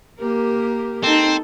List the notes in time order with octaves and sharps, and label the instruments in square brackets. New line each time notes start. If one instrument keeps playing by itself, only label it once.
[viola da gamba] A#3 G4 A#4
[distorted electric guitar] C4 [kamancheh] D#4 A4